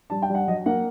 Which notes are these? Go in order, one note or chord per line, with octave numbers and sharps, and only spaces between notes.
G3 A5
G5
G3 F#5
F#3 D#5
A#3 F#5